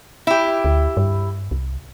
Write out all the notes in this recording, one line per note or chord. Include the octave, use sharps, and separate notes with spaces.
E4 G4
D2
G2
C2